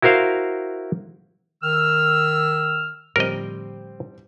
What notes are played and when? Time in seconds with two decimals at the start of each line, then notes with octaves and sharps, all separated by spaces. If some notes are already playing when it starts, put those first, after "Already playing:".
0.02 E4 F#4 A#4 C5 F5
1.63 D#3 E6 F6
3.16 A2 D3 F3 G3 C4 A#4 D#5